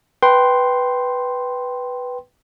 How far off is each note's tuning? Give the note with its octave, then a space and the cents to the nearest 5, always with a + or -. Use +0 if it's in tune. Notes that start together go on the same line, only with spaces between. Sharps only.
B4 +0 G5 -10 C6 +0